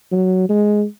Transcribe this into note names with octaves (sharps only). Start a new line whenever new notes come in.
F#3
G#3